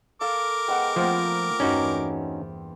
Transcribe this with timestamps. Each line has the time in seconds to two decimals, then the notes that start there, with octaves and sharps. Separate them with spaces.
0.21 A4 A#4 F5 D6
0.68 G#3 B3 F#5 G5
0.96 F3 A3 A#3 C4 F4 G5
1.60 E2 G2 C#4 D#4 F#4